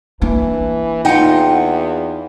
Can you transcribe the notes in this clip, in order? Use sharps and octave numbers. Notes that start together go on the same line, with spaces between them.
E3 A#3 D4
E2 D#4 F4 F#5 G5